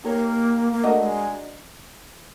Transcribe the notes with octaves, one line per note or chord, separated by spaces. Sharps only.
A#3 D#4 G4 A#4 C#5
A#3
A3 D4 F#4 A#4 D#5
G#3